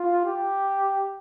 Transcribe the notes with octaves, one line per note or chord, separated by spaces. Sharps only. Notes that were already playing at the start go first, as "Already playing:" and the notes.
Already playing: F4
G4